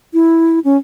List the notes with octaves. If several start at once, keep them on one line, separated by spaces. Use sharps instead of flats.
E4
C#4